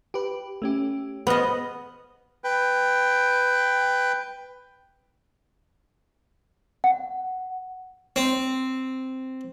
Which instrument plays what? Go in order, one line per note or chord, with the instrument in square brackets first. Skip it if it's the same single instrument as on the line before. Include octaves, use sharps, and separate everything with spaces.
[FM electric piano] G4 B4
A3 C#4 G4
[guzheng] B3 D#5 [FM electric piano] C5 F6
[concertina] B4 G5
[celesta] F#5
[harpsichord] C4